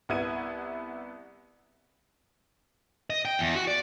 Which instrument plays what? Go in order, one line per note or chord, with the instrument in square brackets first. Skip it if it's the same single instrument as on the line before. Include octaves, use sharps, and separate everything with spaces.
[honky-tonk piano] C2 B3 E4 G#6 D#7
[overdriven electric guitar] D#5
G5
E2
F#4
D5